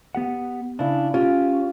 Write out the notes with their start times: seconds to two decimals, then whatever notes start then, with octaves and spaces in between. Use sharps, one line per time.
0.15 B3 G4 F#5
0.79 C#3 D4 E4
1.14 C#4 F4 G4